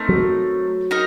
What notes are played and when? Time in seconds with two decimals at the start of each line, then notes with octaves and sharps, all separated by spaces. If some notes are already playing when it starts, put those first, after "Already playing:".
Already playing: A3 C4 D#4 A#4
0.09 F#3
0.91 D#4 A#4